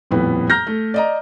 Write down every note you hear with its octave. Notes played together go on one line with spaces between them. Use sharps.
D#1 F2 A2 B3 B4
A#5 F6 G6 A#6
A3
D5 D#5 A#5